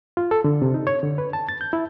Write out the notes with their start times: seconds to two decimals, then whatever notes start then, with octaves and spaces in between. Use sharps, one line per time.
0.17 F4
0.31 A4
0.44 D3
0.62 C3
0.74 D#4
0.87 C#5
1.03 D3
1.18 B4
1.33 A5
1.49 A6
1.61 G6
1.73 E4